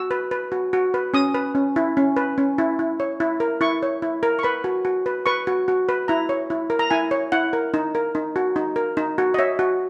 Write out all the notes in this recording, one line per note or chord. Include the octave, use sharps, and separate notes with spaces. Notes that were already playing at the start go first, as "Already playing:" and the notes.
Already playing: F#4 E6
B4
B4
F#4
F#4
B4
C#4 D#6
B4
C#4
E4
C#4
B4
C#4
E4
E4
C#5
E4
A#4
E4 C#6
C#5
E4
A#4
C#6
B4 B5
F#4
F#4
B4
B4 C#6
F#4
F#4
B4
E4 A#5
C#5
E4
A#4
A#5
E4 G#5
C#5
E4 F#5
A#4
D#4
A#4
D#4
F#4
D#4
A#4
D#4
F#4
D#5
C#5 E5
F#4